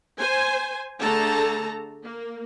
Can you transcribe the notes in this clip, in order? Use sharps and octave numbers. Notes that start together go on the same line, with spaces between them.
C5 G#5
D3 A3 G#4 A4 A5 A#5
A#3